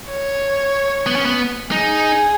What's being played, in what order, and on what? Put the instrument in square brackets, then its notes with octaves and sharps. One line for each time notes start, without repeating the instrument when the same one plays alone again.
[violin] C#5
[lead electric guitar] B3
C#4
B3
[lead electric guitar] D#4 [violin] G#4